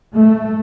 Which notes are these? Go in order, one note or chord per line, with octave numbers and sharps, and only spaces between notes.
A3